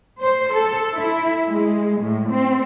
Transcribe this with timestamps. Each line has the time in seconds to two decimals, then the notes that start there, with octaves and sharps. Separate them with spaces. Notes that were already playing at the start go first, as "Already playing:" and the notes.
0.22 C5
0.55 A4
0.96 E4
1.48 G#3
2.02 A2
2.31 C4